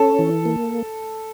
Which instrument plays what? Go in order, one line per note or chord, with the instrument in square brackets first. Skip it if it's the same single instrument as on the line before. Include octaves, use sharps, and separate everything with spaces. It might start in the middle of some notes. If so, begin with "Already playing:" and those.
Already playing: [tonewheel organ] C#4 [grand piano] A4
[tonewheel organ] E3
A#3